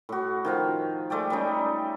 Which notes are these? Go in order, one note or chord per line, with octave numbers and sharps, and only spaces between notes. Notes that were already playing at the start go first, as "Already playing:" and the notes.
A2 F#4
D#3 F3 F5
G#3 A3 D5 G5
G3 A3 C#4 D#4